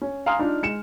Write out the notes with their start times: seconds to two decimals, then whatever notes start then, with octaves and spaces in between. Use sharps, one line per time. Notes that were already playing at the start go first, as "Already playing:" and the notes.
0.01 C#4
0.26 F5 G#5 A#5 C6 D#6 F6
0.39 D4 D#4 F4
0.62 G#3 C#7 E7